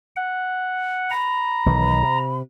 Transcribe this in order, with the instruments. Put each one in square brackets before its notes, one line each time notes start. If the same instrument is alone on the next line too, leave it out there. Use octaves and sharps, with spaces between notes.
[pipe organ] F#5
[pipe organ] A#5 [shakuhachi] B5
[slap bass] B1 D#3 E3
C3